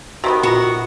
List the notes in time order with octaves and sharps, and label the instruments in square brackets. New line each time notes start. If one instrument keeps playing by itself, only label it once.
[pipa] C3 D#3 B3 [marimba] F#4 B4 B5
[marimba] A#2 F4 A#6 [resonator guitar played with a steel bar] F#4